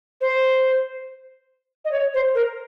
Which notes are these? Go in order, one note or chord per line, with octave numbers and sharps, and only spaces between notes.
C5
D#5
C#5
C5
A#4